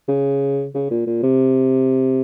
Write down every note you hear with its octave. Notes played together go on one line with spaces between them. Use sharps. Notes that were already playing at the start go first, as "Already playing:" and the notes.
C#3
C#3
A#2
A#2
C3